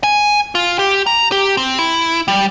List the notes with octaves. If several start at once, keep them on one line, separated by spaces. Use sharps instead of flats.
G#5
F4
G4
A#5
G4
C4
E4
G3